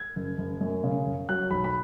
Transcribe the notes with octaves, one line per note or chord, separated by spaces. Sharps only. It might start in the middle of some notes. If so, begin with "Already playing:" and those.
Already playing: G#6
F#1
F#1
F#2
C#3
F#1
F#3 F#6
B1 B5
B5